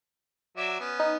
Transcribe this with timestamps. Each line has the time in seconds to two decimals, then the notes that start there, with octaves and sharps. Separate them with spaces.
0.57 F#3 D5 E5
0.80 B3 C#4
1.00 D#4